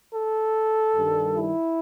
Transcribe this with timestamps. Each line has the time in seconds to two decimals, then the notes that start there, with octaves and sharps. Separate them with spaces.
0.14 A4
0.95 G2 D#3 G3
1.36 E4